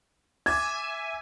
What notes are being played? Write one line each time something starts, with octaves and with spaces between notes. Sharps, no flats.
E5 G#5 D6 G#6 A6